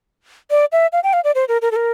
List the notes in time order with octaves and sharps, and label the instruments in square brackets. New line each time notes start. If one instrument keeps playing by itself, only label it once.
[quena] D5
E5
F5
G5
F5
D5
C5
A#4
A#4
A4
A#4